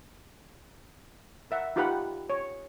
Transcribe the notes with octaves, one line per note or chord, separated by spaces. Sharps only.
A#4 E5 F#5
D#4 F4 G4 B4 F#5 B5
C#5